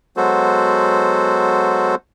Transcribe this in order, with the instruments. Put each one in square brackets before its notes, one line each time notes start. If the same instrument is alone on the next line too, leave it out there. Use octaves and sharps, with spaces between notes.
[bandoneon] F#3 G#3 B3 F#4 A4 C5